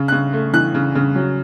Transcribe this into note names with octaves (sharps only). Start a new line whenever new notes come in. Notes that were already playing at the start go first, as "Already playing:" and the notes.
Already playing: C#3
F#6
C#3
A3
E3 F#6
C#3
C#3
F#3